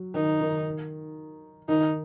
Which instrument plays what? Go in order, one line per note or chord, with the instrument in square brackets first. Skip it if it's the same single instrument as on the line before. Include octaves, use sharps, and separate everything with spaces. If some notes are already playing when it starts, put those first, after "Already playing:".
Already playing: [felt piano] F#3
[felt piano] D#3 [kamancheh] D#4
[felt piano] D#3
[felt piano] D#3 [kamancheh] D#4